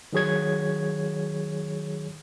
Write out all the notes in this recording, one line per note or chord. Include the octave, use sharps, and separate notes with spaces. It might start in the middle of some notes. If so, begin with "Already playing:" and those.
D#3 F#3 G#4 C#5 G#6